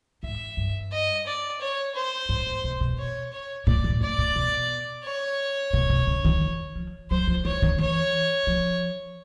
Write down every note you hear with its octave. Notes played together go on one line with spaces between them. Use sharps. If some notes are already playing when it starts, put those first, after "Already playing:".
G#2 E5
G2
D#5
D5
C#5
C5
G#2
A2
B2
B2
C#5
C#5
A#2 D5
A2
A2 D5
A#2
B2
C#5
B2
C3
C#3
D#3
E3
F3
F#3 C5
F3
E3 C#5
D#3
E3 C#5
F3